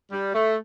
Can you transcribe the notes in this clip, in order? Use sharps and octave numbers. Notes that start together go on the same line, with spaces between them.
G3
A3